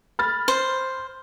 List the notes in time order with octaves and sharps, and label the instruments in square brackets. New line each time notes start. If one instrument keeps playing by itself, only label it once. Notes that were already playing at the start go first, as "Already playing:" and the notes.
[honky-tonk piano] B5 F6 A6
[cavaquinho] C5